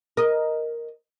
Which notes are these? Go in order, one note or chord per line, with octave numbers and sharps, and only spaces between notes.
A#4 D#5